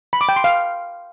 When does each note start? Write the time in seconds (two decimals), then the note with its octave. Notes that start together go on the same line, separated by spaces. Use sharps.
0.13 B5
0.21 D6
0.29 G5
0.36 C6
0.44 F5